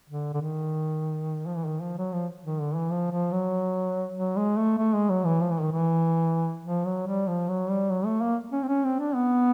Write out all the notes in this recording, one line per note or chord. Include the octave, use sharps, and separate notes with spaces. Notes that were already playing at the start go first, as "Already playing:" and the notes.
D3
D3
D#3
F3
E3
D#3
F3
F#3
F3
D#3
D3
E3
F3
F3
F#3
F#3
G#3
A3
A3
G#3
F#3
E3
F3
E3
D#3
E3
F3
F#3
G3
F3
F#3
G3
F#3
A3
A#3
C#4
C4
C#4
C4
D4
B3